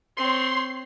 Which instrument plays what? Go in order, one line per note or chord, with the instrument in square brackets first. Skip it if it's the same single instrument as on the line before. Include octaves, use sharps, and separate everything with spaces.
[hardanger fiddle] C4 C#5 [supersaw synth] C6